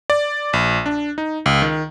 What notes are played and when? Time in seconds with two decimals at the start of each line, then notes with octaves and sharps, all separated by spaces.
0.10 D5
0.53 A#1
0.86 D4
1.18 D#4
1.46 C#2
1.62 D#3